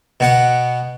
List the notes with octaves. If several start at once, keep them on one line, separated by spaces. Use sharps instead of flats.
B2 B3 F#5